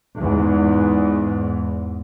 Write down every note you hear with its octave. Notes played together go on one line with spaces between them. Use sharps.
E2 G#2